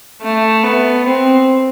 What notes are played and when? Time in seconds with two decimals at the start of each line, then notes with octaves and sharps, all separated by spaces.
0.22 A3
0.64 B3
1.06 C4